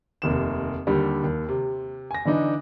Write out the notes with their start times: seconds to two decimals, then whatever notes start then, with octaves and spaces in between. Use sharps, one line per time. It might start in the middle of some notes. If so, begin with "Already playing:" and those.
0.22 F1 D#2 E7
0.87 D#2 D3 G3
1.24 D#2
1.48 C3
2.11 G#5 A#6
2.25 D3 E3 D4 D#4